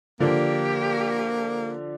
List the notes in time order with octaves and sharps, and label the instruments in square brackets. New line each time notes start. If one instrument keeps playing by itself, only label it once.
[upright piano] D3 F3 D4 [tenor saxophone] A#3 [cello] G4